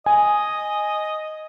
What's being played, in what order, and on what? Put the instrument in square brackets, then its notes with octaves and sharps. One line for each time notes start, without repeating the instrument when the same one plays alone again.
[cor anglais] D#5 [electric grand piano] G#5